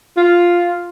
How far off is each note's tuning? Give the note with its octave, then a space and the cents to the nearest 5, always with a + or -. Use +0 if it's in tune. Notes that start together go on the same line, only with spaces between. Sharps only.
F4 +0